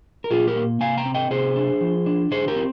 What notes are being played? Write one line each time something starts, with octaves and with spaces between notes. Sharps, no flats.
A#4
A#2 F4 G#4
G4 A#4
A#3
C3 F5 G#5
G5 A#5
C4
D#5 G5
C3 G#4 C5
D4
F3
D4
D3 G#4 C5
G4 A#4
C4